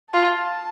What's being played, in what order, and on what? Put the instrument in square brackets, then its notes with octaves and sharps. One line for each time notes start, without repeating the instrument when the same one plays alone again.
[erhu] F4 [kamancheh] A5